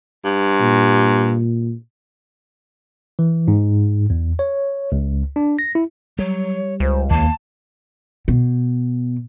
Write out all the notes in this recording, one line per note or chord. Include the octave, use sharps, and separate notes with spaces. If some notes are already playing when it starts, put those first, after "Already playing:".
G2
A#2
E3
G#2
E2
C#5
C#2
D4
A#6
E4
F#3 G3 C#5
C#2 C5
D#2 A#3 A5
B2